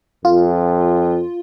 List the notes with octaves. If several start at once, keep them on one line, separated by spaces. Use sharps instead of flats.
F2 F4